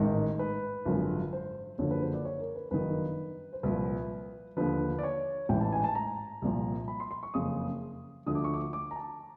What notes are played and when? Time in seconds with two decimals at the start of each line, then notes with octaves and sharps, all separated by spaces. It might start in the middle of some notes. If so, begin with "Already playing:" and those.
Already playing: A1 G#2 D#3
0.39 B4
0.85 G#1 F#2 D3 F3
1.33 C5
1.78 F#1 F#2 D3 F3 C#5
1.91 B4
2.02 C5
2.13 D5
2.25 C#5
2.40 A#4
2.56 B4
2.71 G1 F#2 D#3 B4
3.53 C5
3.63 C2 A#2 F3 B4
4.57 D#2 D3 F3 B4
4.99 D5
5.03 C#5
5.49 A1 G#2 E3 G5
5.61 A5
5.72 G#5
5.84 A5
5.95 A#5
6.42 C2 A#2 F3
6.88 B5
7.00 C6
7.11 C6
7.23 C#6
7.34 F#1 F2 C#3 D#6
8.26 D2 D3 F3 D#6
8.35 D6
8.44 C#6
8.54 D6
8.73 D6
8.91 A#5
8.96 A5